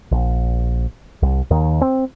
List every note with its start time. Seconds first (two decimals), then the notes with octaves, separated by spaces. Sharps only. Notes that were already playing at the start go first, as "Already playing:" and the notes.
0.11 A#1
1.22 C2
1.51 D#2 D#3
1.81 C4